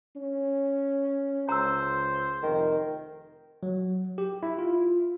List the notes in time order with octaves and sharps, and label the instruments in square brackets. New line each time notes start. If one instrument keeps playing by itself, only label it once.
[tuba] C#4
[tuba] C#2 [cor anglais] C5 [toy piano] A#5 E6
[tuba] F1 [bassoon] D#3
[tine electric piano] F#3
G4
E4
F4